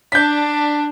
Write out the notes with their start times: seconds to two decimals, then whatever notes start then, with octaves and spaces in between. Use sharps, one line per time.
0.12 D4 G6 B6